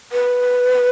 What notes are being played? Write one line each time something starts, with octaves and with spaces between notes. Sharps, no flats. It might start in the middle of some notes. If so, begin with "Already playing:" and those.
B4